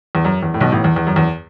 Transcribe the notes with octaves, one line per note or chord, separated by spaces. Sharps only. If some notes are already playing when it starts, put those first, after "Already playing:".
E2
F#2
E2
A2
B1 B2
A1 A2
E2
E2
F#2
E2